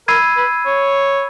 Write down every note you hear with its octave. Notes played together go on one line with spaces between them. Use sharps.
A#4 B5 E6 G#6 C7 D#7
B4
C#5